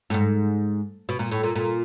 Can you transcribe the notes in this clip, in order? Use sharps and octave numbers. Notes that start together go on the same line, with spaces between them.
A2
G#2
B2
A#2
A2
A#2
A#2